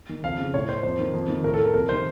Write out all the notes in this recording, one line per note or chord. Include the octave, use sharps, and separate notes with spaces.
D#3
F2 F5
C#3
A2 C#5
C5
F2 C5
D#3
F2
D#3
A2 A#4
A4
A#4
F2 A#4
C3 D#3 C5